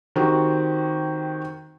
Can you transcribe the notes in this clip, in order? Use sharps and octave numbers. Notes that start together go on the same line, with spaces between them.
D#3 C4 F#4 G4